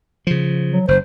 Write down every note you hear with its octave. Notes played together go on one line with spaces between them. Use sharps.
C#3 F3
F#3
F#1 C5